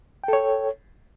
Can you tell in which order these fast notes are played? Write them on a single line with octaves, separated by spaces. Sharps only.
G5 A4 C#5